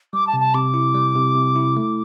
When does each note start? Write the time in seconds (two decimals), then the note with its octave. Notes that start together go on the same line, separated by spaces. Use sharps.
0.13 G3 D6
0.27 A5
0.33 C3
0.40 A5
0.54 C3 D6
0.74 E4
0.94 G3
1.15 C3
1.35 C3
1.56 E4
1.77 A3